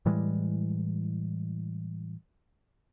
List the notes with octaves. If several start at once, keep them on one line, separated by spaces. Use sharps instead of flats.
A2 E3 G3 G#3